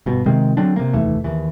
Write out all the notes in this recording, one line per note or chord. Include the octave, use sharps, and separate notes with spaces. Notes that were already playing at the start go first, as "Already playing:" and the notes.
G1 B2
C3 D#3 G#3 C4
D3 F#3 C4 D4
C3 A#3
F1 D#2 E3 A3
D#2 E3